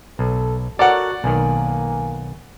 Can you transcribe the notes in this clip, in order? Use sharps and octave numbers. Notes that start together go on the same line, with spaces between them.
B1 A4
F#4 A4 A#4 C#5 D5 F#5
B1 D#3 A#3 G#5